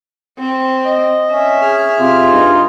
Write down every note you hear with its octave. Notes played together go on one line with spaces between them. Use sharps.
C4
D#5
C#4 E5
G#4 F6
C3 F4
G2 D#4